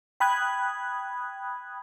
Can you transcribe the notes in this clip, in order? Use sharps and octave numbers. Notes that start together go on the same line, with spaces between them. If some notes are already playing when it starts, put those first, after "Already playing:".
G5 B5 D#6 F#6 G#6